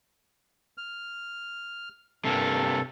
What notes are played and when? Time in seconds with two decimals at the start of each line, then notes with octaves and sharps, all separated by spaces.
0.78 F6
2.25 G2 C3 A#3 A4